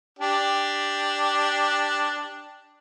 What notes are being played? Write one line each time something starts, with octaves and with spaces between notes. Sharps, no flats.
D4 G4